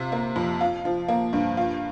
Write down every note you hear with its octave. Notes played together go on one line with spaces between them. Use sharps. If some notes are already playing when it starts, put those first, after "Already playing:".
Already playing: C3 F4
A#3
F2
F4
F3
A#3
G2
F4